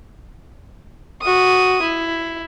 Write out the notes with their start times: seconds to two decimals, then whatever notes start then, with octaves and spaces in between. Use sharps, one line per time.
1.22 F#4 D#6
1.82 E4